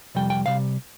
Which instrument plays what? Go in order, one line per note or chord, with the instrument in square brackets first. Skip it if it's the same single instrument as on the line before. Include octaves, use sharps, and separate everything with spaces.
[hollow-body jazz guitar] F2 C3 G3 G5
G5
C3 G3 F5